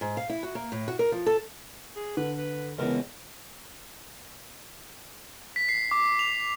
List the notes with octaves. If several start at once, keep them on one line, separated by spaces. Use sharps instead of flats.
G#2
F5
E4
F#4
A#3
A2
F#4
A#4
F3
A4
G#4
D3 B4
B4
C#2 B2 E3 A#4
B6
C7
D6
F7